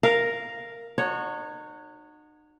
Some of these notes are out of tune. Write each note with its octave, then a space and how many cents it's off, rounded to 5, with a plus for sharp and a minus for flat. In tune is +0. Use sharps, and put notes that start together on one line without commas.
A#4 +0 F5 -5
D#4 -40 F#4 -25 C#5 +0